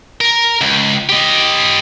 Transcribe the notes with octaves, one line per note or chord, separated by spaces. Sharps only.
A#4
C#2
G4 D#5